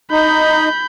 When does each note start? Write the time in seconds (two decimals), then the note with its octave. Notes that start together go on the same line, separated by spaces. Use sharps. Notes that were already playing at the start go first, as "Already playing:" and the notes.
0.11 D#4 B5 G6